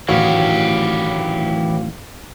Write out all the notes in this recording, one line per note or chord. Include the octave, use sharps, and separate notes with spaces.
D1 A1 D#3 E3 F#4 G4 C#5 F5